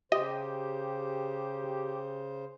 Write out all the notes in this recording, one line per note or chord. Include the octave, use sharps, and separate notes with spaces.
C#3 G4 C5 D#5